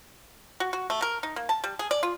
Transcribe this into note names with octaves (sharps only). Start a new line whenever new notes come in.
F#4
F#4
A3
A#4
D#4
A#3
A5
G3
G#4
D5
F4